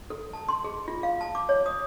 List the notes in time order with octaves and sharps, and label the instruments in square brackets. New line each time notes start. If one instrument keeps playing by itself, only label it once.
[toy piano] A4
A5
C6
G#4
F4
F5
A5
D6
C#5
D#6